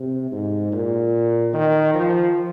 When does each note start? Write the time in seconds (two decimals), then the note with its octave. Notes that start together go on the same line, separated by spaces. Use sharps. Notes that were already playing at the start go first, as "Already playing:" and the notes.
Already playing: C3
0.32 G#2
0.72 A#2
1.54 D#3
1.94 F3